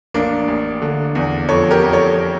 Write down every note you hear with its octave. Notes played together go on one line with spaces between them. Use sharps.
A1 A#3 D4
A1
D3
E2
F2 A4 C#5
G4 A#4
F2
A4 C#5